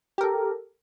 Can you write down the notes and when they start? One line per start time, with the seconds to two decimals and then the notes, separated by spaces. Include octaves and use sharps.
0.18 G4
0.21 A#4
0.23 A4